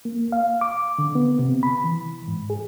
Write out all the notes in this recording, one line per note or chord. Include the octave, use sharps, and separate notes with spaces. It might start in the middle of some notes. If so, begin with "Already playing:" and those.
A#3
F5
D6
D3
B3
C3
B5
E3
G#2
G#4